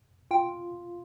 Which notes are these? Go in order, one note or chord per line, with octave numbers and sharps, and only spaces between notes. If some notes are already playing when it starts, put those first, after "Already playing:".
F4 G5